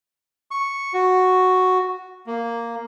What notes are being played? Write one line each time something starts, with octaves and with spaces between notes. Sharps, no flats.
C#6
F#4
A#3